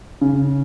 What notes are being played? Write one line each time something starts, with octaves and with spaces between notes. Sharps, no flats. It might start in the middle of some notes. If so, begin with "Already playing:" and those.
C#3